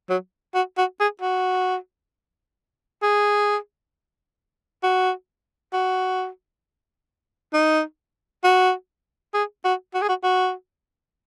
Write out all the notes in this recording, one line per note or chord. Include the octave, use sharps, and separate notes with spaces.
F#3
F#4
F#4
G#4
F#4
G#4
F#4
F#4
D#4
F#4
G#4
F#4
F#4
G#4
F#4
F#4